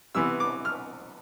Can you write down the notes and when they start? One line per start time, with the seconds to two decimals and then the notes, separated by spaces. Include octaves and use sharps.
0.15 C3 E3 B3 E6
0.40 D6
0.65 F6